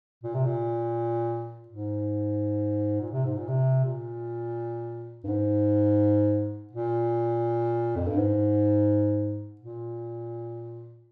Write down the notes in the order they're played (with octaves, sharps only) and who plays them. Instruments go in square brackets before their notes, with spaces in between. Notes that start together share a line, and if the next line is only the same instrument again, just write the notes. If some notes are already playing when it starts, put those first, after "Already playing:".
[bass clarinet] A#2
C3
A#2
G#2
A#2
C3
G#2
A#2
C3
A#2
G2
G#2
A#2
F2
G2
G#2
A#2